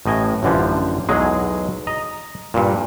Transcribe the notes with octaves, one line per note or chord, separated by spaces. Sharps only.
A1 A2 D#5 G#5
A1 F#2 D3 E3 F3
B1 E2 F#3 G#3 G#4
D#5 A#5
G2 A#2